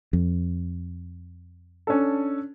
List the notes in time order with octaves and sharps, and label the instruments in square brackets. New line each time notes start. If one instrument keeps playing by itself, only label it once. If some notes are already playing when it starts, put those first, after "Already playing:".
[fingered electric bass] F2
[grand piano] C#4 D4 A4